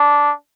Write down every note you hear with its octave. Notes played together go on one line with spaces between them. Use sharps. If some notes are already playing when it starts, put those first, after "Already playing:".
Already playing: D4